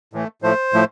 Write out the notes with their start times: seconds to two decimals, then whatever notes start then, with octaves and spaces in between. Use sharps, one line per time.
0.13 A2 E3 A3
0.42 A2 F3 A3 C5
0.73 A2 F3 A3